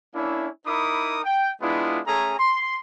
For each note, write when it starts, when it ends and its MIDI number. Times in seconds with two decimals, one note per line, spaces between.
0.14 0.48 58
0.14 0.48 61
0.14 0.48 62
0.14 0.48 64
0.66 1.19 63
0.66 1.19 64
0.66 1.19 70
0.66 1.19 83
0.66 1.19 86
0.66 1.19 87
1.25 1.51 79
1.61 2.00 56
1.61 2.00 59
1.61 2.00 62
1.61 2.00 64
1.61 2.00 65
2.07 2.34 57
2.07 2.34 61
2.07 2.34 68
2.07 2.34 69
2.07 2.34 80
2.07 2.34 82
2.39 2.78 84